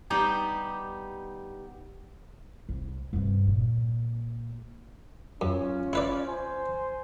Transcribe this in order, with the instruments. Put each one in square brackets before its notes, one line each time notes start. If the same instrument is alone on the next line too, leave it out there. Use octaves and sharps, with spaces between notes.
[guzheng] G3 B3 D#4 G4
[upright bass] C2
G2 C3
A#2
[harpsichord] F#2 [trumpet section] C#4 F4
[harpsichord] E4 B4 D5
[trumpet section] C5 G#5